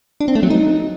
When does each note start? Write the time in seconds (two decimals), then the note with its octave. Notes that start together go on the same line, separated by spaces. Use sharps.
0.21 D4
0.28 C4
0.35 A3
0.43 F#3
0.50 D#4